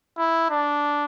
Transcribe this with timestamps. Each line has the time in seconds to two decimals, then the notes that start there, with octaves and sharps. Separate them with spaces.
0.18 E4
0.50 D4